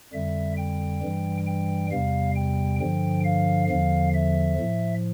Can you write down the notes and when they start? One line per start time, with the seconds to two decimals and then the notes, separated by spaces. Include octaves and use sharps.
0.13 F2 D3 G3 E5
0.57 G5
1.02 G2 E3 G3
1.47 G5
1.91 E2 C3 G3 F5
2.36 G5
2.80 G2 D3 F3 G5
3.25 F5
3.69 E2 D3 F3 F5
4.14 E5
4.59 A2 F3